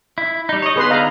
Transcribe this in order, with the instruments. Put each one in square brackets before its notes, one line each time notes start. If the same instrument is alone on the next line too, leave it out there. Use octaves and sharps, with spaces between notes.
[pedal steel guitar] E4
G3 D#4
C#5 D#5
[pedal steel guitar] D3 B3 D#4 [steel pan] G#4 B4 C6
[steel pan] D#5 F5 A#5